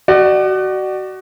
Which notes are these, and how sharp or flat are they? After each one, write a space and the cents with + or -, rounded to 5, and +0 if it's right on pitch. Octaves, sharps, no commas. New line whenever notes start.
F#4 +25 D5 +35